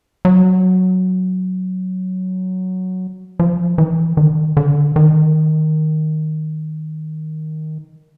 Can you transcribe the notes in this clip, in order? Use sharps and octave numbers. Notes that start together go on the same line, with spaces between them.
F#3
F3
E3
D#3
D3
D#3